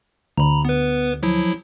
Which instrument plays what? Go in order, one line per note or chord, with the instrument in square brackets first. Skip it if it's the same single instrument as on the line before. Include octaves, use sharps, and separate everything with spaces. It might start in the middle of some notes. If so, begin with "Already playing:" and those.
[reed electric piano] D2 [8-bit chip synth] A#5 B5
[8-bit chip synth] B3 B4
F3 F#3 E4